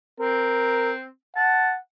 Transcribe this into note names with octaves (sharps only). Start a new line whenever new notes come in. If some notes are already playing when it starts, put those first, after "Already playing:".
C4 A#4
F#5 A5